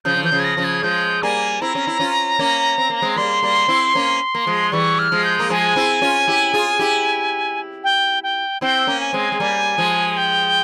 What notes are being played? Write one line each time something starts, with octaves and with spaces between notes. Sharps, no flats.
C#3 F3 G6
C#3
E3 G6
C#3 F3
G#6
A#6
C#3 F3
G#6
F3 G#3 G6
G3 A#3 G#5
C4 E4 A#5
C#4
E4
C#4 F4
A#3 C#4
C4
A#3
G#3 C4
G3 A#3 C6
G3 A#3
C4 E4
A#3 C#4
A#3
F3 G#3
E3 G3 C#6
F6
F3 G#3
G6
A#3
F3 G#3 G#5
C4 E4
C#4 F4
E4 G4
F4 G#4
E4 G4
G5
G5
C4 E4 G5
A#3 C#4
G#5
G#3 C4
G#3
G3 A#3
F3 G#3
G5